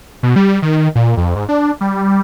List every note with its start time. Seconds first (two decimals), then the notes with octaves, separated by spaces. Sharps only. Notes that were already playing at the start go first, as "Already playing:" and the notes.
0.23 B2
0.36 G3
0.62 D#3
0.95 A#2
1.17 F2
1.36 G#2
1.49 D4
1.81 G3